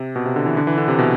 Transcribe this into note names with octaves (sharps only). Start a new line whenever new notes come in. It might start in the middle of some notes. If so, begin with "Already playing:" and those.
Already playing: C3
B2
C3
D3
E3
D3
E3
D3
C3
B2